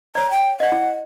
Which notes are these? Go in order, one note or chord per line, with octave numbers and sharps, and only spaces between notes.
C#5 D5 A#5
G5
D5 D#5 F#5
E4